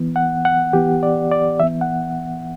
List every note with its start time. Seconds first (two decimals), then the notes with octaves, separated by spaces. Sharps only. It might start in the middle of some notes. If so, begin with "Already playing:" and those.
Already playing: E3 B3
0.16 F#5
0.45 F#5
0.73 E3 B3 G4
1.03 D5
1.31 D5
1.60 E3 B3 E5
1.81 F#5